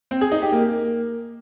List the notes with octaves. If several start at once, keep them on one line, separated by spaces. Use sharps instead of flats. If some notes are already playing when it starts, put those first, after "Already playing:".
C4
G#4
D#4
G4
A#3